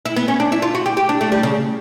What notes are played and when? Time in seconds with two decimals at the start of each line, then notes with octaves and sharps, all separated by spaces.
0.05 E4
0.16 B3
0.28 C#4
0.40 D4
0.52 E4
0.62 F4
0.75 F#4
0.86 G4
0.97 G4
1.09 D4
1.21 A3
1.32 G3
1.43 C#3